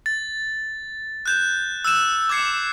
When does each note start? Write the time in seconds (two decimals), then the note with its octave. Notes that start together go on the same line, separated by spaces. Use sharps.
0.06 A6
1.26 F#6 G6 E7
1.85 E6 F#6 G6 E7
2.29 D6 E6 G#6 C7 C#7